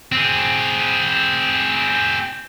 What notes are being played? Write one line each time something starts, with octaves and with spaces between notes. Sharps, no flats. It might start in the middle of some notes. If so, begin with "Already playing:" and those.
C4 G#4